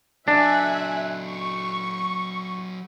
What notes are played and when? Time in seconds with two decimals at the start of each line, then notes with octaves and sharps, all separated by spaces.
0.28 F#3 D4 A4 E5 G#5 F#6
1.26 C#6